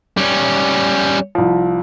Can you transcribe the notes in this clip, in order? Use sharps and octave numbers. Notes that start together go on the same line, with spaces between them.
G3 C#4
C2 F3